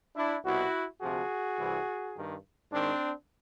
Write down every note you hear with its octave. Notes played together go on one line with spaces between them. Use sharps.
D4 E4
C2 B2 E4 F#4
D2 C3 F3 F#4 G#4
C2 C3 E3
G2 D#3
G#2 D#3 C4 D4